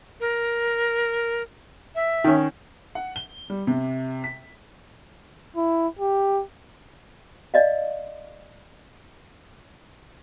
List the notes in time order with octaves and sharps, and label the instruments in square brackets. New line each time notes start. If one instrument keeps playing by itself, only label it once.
[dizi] A#4
E5
[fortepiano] D#3 C#4
[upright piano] F#5
G7
G3
C3
B6
[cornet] E4
G4
[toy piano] D5 D#5 F5